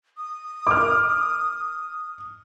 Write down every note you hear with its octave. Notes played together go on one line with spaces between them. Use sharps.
D#6
D6 F6